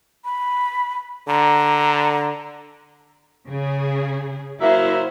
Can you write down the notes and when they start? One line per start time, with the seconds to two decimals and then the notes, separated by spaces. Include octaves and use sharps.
0.25 B5
1.28 D3 A#5
3.48 C#3 G#4
4.60 F#3 A#3 E4 C5 E5